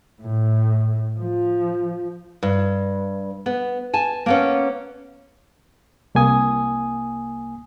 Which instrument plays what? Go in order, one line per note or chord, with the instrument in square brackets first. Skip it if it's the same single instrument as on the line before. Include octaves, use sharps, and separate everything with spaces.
[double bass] A2
F3
[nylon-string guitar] G2
B3
G#5 A5
A#3 B3 C#4
[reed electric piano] C2 A#3 G#5 D#6